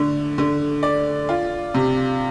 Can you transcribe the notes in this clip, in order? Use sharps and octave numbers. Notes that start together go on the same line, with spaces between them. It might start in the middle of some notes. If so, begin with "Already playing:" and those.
Already playing: D3 A3
D3
D5
F4
C3